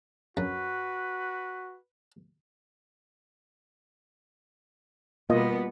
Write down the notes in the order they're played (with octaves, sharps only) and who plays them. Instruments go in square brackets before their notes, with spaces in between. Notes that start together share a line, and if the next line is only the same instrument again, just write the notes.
[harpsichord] F#2 [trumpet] F#4 [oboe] B4
[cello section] B2 G3 B3 [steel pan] A#3 F4 D#5